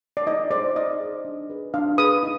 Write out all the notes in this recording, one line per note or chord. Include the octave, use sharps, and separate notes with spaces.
D5
D#4 D#5
G#4 C5 D5
D#4 D#5
G#4 C5
D4
G#4 B4
D4 F5
G#4 B4 D#6
D#4